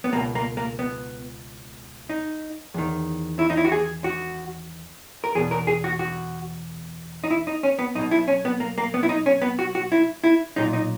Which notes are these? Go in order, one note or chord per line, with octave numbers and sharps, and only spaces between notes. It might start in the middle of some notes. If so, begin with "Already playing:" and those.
B3
C#2 B2 A#3
A#3
A#3
B3
D#4
E2 D#3
E4
D#4
E4
F#4
G#4
F#4
A#4
E2 B2 G#4
A#4
G#4
F#4
F#4
D#4
E4
D#4
C#4
B3
B1 B2 D#4
E4
C#4
B3
A#3
A#3
B3
E4
D#4
C#4
B3
F#4
F#4
E4
E4
B1 A#2 D#4
D#4